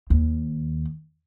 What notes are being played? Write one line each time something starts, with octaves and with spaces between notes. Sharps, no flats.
D#2